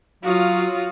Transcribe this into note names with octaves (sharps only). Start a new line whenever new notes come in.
F#3 F4 F#4 F5 D#6